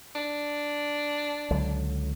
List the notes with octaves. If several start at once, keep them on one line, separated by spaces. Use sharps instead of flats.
D4
C#2 D3 F#3